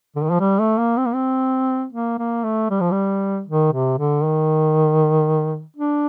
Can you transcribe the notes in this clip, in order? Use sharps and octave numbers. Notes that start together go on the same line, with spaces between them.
D3
D#3
F3
G3
A3
A#3
C4
A#3
C4
A#3
A#3
A3
G3
F3
G3
D#3
C3
D3
D#3
D4